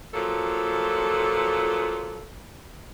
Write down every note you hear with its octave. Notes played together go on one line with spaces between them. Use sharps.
A#2 F3 F#3 A4